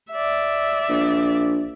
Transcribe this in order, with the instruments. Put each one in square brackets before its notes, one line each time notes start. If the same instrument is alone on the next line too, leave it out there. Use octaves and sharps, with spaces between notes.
[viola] D5 E5
[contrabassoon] A#1